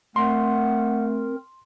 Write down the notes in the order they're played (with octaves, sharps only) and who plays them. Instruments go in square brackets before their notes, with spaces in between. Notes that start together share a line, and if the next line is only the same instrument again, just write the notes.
[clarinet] A3 [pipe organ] C4 A#4 [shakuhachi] F#5 [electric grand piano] C6